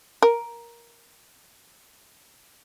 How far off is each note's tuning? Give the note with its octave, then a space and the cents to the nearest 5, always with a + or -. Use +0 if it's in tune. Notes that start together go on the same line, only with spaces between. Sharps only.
A#4 +10